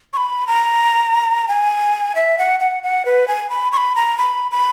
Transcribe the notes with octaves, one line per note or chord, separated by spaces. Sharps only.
C#6
B5
A#5
G#5
E5
F#5
F#5
F#5
B4
G#5
B5
C#6
B5
A#5
B5
B5